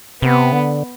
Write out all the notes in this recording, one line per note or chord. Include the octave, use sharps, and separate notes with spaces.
C3 B3
D3